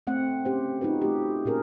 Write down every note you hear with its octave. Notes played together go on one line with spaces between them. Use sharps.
A3 C4 F#5
C#4 G4 C5
D#4 F4 F#4 B4
A3 G4
A#2 C#4 G#4 A#4